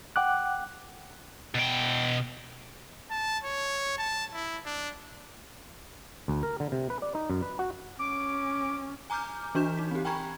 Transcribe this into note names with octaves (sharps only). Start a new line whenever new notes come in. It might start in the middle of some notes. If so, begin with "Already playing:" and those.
F#5 G5 D6 F#6
B2 G5
A5
C#5
A5
E4
D4
D2
A#4
D3
C3
B4
D5
D#4
F#2
B4
F#4
C#4 D6
G#5 A#5 D6 F6 G6
E3 D4 F#4 G6 E7
D#4 B6
C4 G4
G5 G#5 A#5 B5 C#6 G#6